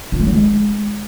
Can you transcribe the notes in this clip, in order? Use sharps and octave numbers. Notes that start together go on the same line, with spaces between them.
F4
G#3
F#3
G#3